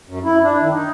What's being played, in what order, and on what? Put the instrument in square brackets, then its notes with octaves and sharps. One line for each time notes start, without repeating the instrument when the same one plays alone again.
[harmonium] F#2
E4
D4
D#3
D#4